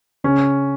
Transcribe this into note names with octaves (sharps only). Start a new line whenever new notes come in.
C#3 C#4